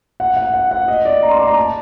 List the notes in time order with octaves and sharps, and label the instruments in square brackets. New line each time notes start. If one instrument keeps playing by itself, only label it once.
[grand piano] F#5
F#5
F#5
F#5
D#5
D5
A#5
C6
D6
A#5
A5